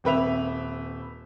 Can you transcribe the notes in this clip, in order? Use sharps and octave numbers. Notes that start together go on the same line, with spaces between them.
D#1 C4 B4 E5 F7